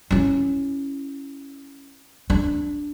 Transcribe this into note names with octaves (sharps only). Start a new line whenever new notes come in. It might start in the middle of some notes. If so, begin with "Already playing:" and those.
C#4 E4
D4